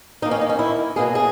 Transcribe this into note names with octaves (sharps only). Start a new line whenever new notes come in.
D#3 A#3 D#4
C#4
D#4
C#4
E4
B2 F#3 A#3 G#4
G#4